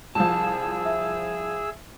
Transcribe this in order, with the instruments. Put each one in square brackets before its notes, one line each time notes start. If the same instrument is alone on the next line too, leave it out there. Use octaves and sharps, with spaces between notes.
[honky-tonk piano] C2 F3 [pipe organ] G#4 E6 [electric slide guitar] A5
[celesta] E5